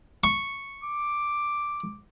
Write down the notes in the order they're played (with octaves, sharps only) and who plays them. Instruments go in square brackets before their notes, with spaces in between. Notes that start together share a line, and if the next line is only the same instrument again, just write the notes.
[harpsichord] C#6
[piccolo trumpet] D6